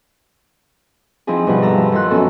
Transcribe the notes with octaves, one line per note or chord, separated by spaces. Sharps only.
F3 C4 D#4 E4 G#4
G2 B2 F3 B4 F#5
A4 A#5 E6
F3 E4
D#3 F3 E4 C6 E6 F#6
F#2 B3 C#4 F#4 A4